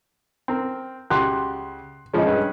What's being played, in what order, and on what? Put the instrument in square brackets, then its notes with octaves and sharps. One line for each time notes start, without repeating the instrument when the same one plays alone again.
[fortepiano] C4 A#4
[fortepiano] C#2 F#4 G4 [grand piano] C6 F#6
[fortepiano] C#3 F3 C#4 [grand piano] G#3 D#5
[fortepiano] G2 C#4 B4